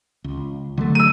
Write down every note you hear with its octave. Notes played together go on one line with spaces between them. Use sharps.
C#2
D3 F#3 A3
E6 D#7